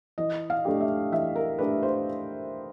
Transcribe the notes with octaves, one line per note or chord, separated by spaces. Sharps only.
E3 D#5
F5
A3 D4 G4
E5
E3 E5
A#4
A3 D4 G4 B4
C5